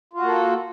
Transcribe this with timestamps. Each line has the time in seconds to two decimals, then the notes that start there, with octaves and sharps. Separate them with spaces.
0.13 F4
0.18 F#4
0.23 A#3
0.27 A4